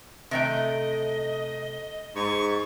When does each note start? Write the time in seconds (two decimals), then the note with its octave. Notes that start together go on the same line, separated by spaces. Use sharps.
0.31 C3 A3 D#5 G5
2.15 G#2 C#6